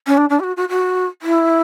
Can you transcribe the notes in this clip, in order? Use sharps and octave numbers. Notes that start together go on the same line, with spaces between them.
C#4
D4
D4
G4
F#4
F#4
F#4
E4